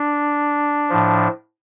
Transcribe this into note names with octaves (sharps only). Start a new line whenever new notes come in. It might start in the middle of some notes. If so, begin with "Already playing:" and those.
Already playing: D4
A2 F3